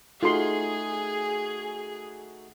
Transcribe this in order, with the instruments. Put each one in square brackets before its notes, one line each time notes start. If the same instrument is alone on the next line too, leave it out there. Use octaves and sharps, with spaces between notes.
[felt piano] A3 D#4 F#4 [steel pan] F4 C6 [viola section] G#4